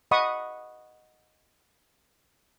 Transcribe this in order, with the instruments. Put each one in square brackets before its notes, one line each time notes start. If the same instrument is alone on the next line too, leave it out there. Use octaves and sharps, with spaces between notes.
[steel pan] D#5 F#5 B5 C#6 D#6